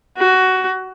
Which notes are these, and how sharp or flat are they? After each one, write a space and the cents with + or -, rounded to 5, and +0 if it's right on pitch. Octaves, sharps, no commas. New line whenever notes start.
F#4 +15